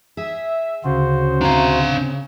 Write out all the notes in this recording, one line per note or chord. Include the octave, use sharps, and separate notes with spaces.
G#4 E5
D2 C#3 F#4 C5
C3 D4 F5 G#5 A#5